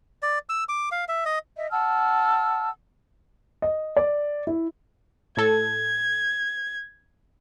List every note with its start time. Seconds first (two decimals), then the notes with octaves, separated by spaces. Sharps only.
0.22 D5
0.49 E6
0.69 D6
0.92 F5
1.08 E5
1.26 D#5
1.57 D#5 E5
1.71 F#5 A5 E6 F6
3.62 D#5
3.97 D5
4.47 E4
5.37 A2 A4 G#6